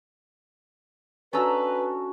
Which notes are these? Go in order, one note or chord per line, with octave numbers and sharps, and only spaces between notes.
C#4 D4 F#4 A4 B4 A#5 E6